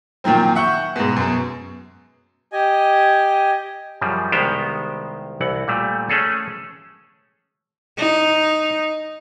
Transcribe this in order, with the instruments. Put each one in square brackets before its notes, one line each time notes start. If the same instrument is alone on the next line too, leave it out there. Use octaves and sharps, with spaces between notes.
[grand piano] A#2 D#3 F3 F#3 C4
E5 F#5 C#6 G6
G#2 B2
F#2 B2
[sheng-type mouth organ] G4 D#5 G#5
[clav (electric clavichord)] F#2 C#3 F3 G3
C2 D#3 G#3 B3 G4 C5
C2 E3 F#5
A#2 G3 A3
A3 C#4 G#4 A4
[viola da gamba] D#4